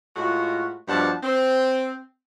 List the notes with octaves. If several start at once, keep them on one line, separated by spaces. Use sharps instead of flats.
A2 G#3 F4 F#4
G2 B2 F3 G3 F#5 A5
C4